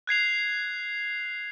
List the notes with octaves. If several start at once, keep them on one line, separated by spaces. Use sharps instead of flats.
F#6 G#6 C7 F7